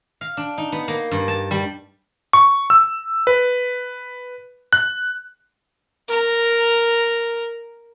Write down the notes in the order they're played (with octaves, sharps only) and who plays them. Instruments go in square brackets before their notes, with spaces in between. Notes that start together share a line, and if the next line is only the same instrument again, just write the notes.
[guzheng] F5
D4
D#4
B3
A#3
G2
A5
G3
[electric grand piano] C#6
E6
B4
F#6
[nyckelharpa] A#4 A#5